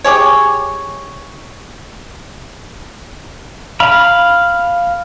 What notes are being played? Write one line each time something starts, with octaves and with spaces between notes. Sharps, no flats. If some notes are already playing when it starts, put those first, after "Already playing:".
G4 G#4 C#5
F5 B5